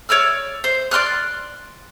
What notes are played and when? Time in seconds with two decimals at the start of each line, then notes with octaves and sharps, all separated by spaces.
0.09 C#5 D5 E6 F6
0.64 C5
0.91 D5 C6 F6 F#6